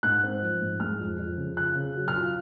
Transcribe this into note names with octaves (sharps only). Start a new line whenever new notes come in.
G#2 F#6
C4
F3
G#2
G#3 F6
F2
F2
C#3
F4 F#6
C#3
F#3
F6
F4